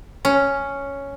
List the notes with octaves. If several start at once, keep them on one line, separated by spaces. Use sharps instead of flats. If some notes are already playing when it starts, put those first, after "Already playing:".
C#4